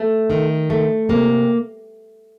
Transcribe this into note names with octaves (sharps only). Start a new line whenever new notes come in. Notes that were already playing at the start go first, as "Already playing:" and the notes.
Already playing: A3
D#3
A3
C3 A#3